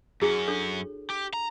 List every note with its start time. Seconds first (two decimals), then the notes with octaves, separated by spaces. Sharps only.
0.21 F#2 C#4 E4 F#4 G#4
0.47 D4 A4 C#5
1.10 G4
1.34 A#5